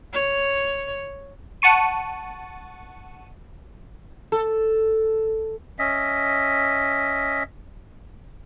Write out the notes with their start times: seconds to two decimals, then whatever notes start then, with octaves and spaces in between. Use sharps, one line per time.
0.14 C#5
1.62 F#5 A5 C#6 D#7
4.32 A4
5.79 C#4 D#5 E5